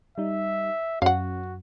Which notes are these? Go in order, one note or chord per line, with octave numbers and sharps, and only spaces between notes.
G3 D#4 E5
F#2 C#4 F#4 F5 F#5